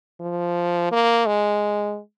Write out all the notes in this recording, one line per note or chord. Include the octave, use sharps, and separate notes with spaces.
F3
A#3
G#3